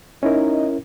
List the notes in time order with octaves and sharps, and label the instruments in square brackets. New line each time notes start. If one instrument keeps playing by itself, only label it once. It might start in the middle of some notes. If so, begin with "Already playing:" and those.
[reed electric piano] C#4 E4 A#4 [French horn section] D#4 D#5